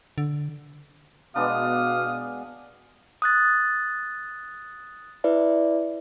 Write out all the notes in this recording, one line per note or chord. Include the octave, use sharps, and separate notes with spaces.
D3
B2 G#3 B3 D4 F5 D#6
D#6 F#6 A6
E4 B4 D5 E5